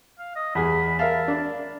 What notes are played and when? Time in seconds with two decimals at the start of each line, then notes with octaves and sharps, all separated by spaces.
0.19 F5
0.36 D#5
0.55 E2 G#4 B5
0.99 A#4 E5 F5 A5
1.28 D4